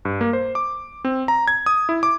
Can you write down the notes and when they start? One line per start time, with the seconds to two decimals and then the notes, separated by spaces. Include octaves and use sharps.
0.05 G2
0.21 A#3
0.33 C5
0.55 D6
1.05 C4
1.28 A#5
1.48 G#6
1.66 D#6
1.89 E4
2.03 D6